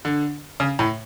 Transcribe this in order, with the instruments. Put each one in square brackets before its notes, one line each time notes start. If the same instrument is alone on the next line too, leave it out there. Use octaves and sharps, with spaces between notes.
[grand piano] D3
C#3
A2